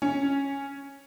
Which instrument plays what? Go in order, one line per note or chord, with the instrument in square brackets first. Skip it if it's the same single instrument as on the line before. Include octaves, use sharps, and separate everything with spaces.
[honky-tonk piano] C#4